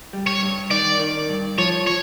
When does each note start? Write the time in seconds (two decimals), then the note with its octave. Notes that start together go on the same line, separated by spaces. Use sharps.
0.13 G3
0.27 C#5
0.42 G2
0.71 D#3 D5
1.00 D#3
1.29 G2
1.58 F3 C#5
1.87 C#5